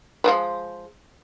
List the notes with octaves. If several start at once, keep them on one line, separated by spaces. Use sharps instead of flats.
F3 G#3 B3